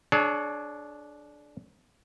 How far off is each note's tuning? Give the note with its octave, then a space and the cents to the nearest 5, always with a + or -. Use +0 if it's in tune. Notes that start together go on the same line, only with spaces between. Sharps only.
D4 +0 G#4 +45 C#5 +15